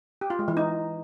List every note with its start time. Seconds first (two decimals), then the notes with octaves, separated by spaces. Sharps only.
0.21 G4
0.30 F4
0.39 G#3
0.48 E3
0.57 D#4